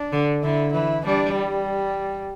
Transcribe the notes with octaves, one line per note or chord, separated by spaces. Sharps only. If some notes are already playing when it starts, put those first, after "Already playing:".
Already playing: D4
D3
D3 E4
E3 E4
G3 D4
G3